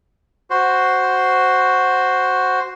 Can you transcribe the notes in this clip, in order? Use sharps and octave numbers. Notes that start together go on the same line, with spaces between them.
F#4 C5